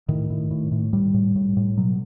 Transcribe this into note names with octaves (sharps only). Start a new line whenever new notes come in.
A2 D#3
A2
A2
A2
A2 G3
A2
A2
A2
B2 F#3